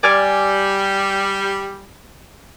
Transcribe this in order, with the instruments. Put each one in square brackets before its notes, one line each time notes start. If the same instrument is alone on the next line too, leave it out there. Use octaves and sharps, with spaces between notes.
[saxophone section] G3 [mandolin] D5 G#5 F6